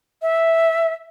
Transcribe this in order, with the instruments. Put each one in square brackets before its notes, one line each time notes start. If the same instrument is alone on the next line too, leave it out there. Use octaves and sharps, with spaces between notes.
[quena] E5